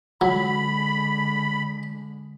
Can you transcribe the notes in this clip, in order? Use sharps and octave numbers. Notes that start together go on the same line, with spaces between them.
D3 F#3 G#3 B5